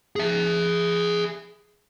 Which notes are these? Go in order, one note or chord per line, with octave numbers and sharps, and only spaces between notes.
G#4 E5